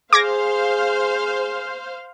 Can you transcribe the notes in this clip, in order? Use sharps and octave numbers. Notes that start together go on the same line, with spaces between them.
G#4 C5 F5 D6 G#6 A#6